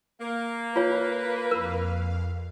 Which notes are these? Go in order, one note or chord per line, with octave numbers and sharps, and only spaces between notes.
A#3
F4 B4 C#5
F2 A#4 F5